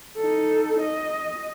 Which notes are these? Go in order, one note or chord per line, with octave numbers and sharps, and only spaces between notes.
D#4 A4
D#5